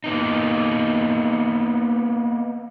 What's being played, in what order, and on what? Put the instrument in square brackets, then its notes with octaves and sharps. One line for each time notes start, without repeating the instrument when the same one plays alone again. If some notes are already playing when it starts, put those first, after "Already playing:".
[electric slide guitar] A#3 B3 D#4